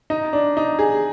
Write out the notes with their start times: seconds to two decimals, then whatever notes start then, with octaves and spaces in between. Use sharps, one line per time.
0.10 D#4
0.33 D4
0.57 D#4
0.79 G#4